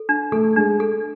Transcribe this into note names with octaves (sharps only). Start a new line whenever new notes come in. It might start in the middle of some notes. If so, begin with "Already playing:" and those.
Already playing: A4
D4
A3 A4
G#3 D4
A4